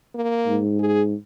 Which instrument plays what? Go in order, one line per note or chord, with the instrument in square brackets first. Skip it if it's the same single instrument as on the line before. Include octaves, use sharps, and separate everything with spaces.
[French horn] A#3
[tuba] G#2
[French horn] G#4